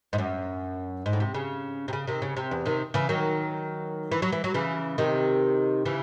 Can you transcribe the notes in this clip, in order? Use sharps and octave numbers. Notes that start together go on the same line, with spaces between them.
G#2
F#2
G#2
A2
C3
C#3
C3
C#3
C3 D#3
C#3
C3
E2
C3 D#3
C#3 E3
D#3 F#3
E3
F#3
E3
F#3
C#3 E3
C3 D#3
C#3 E3